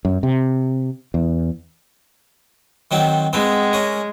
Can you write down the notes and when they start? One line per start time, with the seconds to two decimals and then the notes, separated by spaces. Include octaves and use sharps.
0.05 F#2
0.23 C3
1.14 E2
2.91 D#3 F#3 C4
3.33 G#3 B3 C4
3.73 C#4 A#4